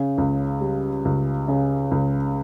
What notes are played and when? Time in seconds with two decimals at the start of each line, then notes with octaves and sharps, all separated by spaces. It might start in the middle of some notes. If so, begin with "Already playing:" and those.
Already playing: C#3
0.18 C#2
0.61 G3
1.05 C#2
1.48 C#3
1.91 C#2